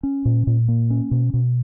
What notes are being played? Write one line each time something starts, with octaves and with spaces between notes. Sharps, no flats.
C#4
A#2
A#2
A#3
C#4
B2
B2